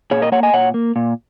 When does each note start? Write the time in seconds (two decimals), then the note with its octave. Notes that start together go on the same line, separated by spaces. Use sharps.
0.11 A#2 G#4 C#5
0.22 A#4 D#5
0.32 A#3 C#5 F#5
0.43 D#5 G#5
0.54 A#2 C#5 F#5
0.74 A#3
0.96 A#2